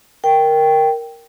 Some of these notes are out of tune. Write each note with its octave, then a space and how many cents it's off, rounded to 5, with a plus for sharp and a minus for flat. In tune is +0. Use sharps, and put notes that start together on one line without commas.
A#4 +0 G5 +0